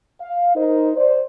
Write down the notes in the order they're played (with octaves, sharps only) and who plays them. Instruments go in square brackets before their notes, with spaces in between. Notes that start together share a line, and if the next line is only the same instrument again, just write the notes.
[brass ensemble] F5
D#4 A#4 C5 D#5
C5 D5